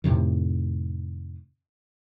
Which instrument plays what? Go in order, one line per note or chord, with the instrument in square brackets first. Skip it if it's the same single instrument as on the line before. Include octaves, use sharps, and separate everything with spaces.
[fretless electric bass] F2 A2 C3 D#3